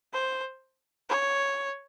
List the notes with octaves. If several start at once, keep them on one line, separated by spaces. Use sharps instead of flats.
C5
C#5